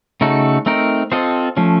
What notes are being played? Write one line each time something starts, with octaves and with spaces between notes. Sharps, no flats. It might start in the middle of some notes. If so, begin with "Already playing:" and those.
C#3 A3 D#4 F#4 A4
A3 C4 D#4 A#4
C4 F4 A4 C5 D#5
F3 A3 C#4